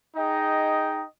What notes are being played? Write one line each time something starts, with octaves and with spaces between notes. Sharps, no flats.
D#4 G#4 D#5 G5